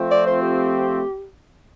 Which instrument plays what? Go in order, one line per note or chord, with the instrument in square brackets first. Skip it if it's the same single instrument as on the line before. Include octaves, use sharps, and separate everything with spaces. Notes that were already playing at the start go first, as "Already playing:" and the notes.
Already playing: [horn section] F3 A3 C4 F4
[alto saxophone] D5
C5
G4